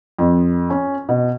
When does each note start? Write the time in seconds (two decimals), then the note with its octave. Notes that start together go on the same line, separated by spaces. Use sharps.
0.19 F2
0.70 C#4
1.09 B2